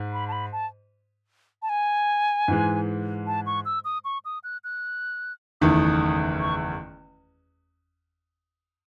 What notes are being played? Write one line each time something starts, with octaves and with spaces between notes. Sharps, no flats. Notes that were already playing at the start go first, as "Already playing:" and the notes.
Already playing: G#2
B5
A5
B5
A5
A5
G#5
G#2 E3 G#3
A5
C#6
E6
D#6
C#6
D#6
F#6
F#6
F#1 E2 D#3 A3 E4 D#6
C#6